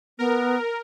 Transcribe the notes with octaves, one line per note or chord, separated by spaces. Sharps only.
B3 A#4